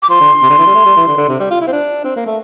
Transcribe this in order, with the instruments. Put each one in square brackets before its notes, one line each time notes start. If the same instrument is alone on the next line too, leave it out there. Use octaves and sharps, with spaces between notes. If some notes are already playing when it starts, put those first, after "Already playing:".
[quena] D6
[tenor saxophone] F3 [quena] C6
[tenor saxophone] D3
C3
D3
E3
G3
A3
G3
E3
D3
D3
C3
G3
F4
E4
C4
D4
C4
A#3
A3